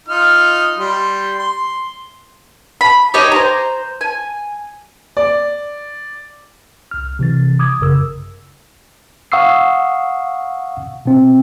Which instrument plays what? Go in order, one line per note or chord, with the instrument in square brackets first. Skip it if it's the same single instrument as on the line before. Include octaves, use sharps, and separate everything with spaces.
[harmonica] D#4 F4 F6
G3 C6
C6
[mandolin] B5
D#4 G4 C#5 D#5
C5 A#5
G#5
[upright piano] D5
[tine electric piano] C2 F6
C3 E3 A6
D6 D#6 G#6
G#1 F#2 C#3 A#4 E6
F5 F#5 C#6 D#6 E6 C7
B2 C4